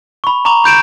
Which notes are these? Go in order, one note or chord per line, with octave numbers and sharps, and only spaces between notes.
B5 C#6
A#5 C#6 D6 F7
B5 G6 D7 E7